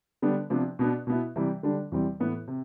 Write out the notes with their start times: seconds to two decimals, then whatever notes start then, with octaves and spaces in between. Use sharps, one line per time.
0.22 D3 G3 B3 D4
0.50 C3 F3 B3 D4
0.79 B2 B3 D4
1.07 B2 B3 E4
1.36 C3 E3 G3
1.63 D3 G3 D4
1.92 E2 C3 E3 G3 C4
2.20 A2 E3 B3 E4
2.48 C3